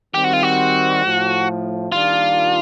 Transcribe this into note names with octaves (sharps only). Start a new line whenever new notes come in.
D#3 G3 C4 G4
F#4
F4
F#4
A2 F3 A3
D#3 G3 A#3 D4 F4